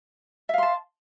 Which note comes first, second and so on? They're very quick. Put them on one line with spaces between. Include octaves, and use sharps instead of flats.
E5 F5 C6 A5